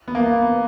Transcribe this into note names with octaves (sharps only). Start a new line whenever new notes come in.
B3
A#3
B3